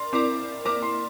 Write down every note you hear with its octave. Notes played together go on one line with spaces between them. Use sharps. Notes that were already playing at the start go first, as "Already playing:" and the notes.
Already playing: A#4 D5 C6
C4 E4 A#4 D5 D6
A#3 E4 A#4 D5 D6
C6